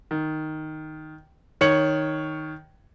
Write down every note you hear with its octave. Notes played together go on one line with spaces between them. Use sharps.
D#3
D#3 C#5 C#7 F#7